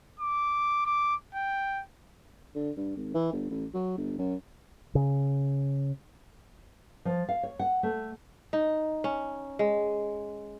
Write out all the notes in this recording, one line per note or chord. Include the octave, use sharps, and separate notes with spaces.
D6
D6
G5
D3
G2
G#1
E3
G1
A1
F#3
G1
F#2
C#3
F3
F5
C#5
F#5
A3
D#4
C#4
G#3